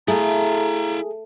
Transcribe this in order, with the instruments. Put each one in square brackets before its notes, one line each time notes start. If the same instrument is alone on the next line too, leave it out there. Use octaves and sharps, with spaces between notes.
[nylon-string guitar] A3 [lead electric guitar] E4 F5 [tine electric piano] G#4 [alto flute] A#5